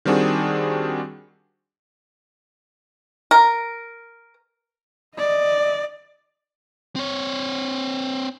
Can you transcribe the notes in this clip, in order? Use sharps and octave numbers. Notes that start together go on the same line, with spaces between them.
D#3 G3 C4 D4 F#4 G#4
A#4
D5 D#5
C4 C#5